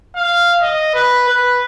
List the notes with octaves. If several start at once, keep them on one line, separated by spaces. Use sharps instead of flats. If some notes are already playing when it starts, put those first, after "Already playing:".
F5
D#5
B4
B4